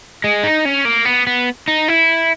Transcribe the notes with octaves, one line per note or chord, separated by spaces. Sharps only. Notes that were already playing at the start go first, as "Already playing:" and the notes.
G#3
D#4
C#4
A#3
B3
B3
D#4
E4